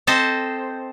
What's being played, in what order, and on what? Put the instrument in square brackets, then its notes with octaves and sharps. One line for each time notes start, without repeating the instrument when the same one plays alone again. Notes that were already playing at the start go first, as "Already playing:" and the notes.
[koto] C4 A4 C5 D#5